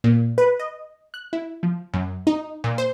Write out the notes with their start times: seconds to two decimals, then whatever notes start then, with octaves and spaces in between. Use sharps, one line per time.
0.04 A#2
0.38 B4
0.59 D#5
1.14 F#6
1.33 E4
1.63 F3
1.94 F#2
2.27 D#4
2.64 A#2
2.78 C5